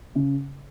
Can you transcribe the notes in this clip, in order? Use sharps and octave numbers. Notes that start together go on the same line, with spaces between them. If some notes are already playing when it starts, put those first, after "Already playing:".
C#3